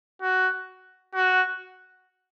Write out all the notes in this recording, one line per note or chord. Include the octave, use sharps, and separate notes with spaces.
F#4
F#4